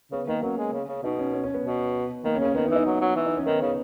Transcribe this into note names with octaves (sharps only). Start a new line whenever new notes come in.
C#3 B3
D#3 A#3
F#3 C#4
G#3
C#3
C#3
B2 D#4
C#4
C#4
C#4
B3
B2
D#3 A#3
C#4
C#3
C#4
D#3 B3
D#4
E3
D#4
F#3
F#3
E3
D#4
C#4
D#3 B3
C#3